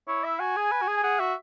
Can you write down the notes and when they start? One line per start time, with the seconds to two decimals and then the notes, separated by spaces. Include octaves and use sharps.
0.08 E4 C#5
0.24 E5
0.40 F#4 G#5
0.56 G#4
0.72 B4
0.82 F#4
0.87 G#4
0.97 G#5
1.03 G#4 F#5
1.19 F#4 E5